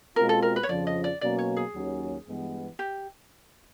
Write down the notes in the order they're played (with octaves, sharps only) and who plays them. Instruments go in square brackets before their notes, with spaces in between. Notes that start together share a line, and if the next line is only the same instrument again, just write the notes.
[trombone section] B2 G#3 C4 F4 [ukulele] A#4
[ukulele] A4
A#4
B4
C#5
[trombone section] F2 C#3 F3 [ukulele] D5
[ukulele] D#5
D5
[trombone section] B2 F#3 A#3 C#4 [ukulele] D5
[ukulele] C#5
G#4
[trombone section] D#2 D#3 F#3 A#3 C#4
G2 E3 G#3 B3
[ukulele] G4